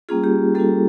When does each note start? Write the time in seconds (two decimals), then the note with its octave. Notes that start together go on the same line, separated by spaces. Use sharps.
0.09 G3 A#3 C#4 F4 G#4
0.24 G4
0.55 G3 A#3 C#4 F4 A4